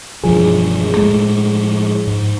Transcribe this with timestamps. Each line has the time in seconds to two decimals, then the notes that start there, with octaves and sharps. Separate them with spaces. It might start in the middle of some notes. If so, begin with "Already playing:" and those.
0.24 E1 E2 G2 F3 G#4
0.95 A2 G#3 A3
2.07 G#2